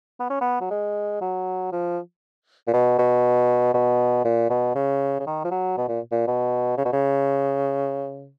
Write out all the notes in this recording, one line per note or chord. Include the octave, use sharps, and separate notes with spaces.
B3
C#4
B3
F#3
G#3
F#3
F3
A#2
B2
B2
B2
A#2
B2
C#3
C#3
D#3
F3
F#3
B2
A#2
A#2
B2
C#3
B2
C#3